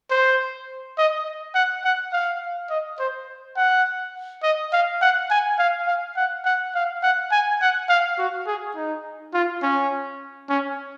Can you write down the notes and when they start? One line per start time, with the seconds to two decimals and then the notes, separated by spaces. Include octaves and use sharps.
0.10 C5
0.98 D#5
1.55 F#5
1.84 F#5
2.12 F5
2.70 D#5
2.99 C5
3.57 F#5
4.43 D#5
4.72 F5
5.02 F#5
5.31 G#5
5.59 F5
5.87 F5
6.17 F#5
6.45 F#5
6.75 F5
7.03 F#5
7.32 G#5
7.61 F#5
7.89 F5
8.18 F#4
8.47 G#4
8.76 D#4
9.34 F4
9.62 C#4
10.49 C#4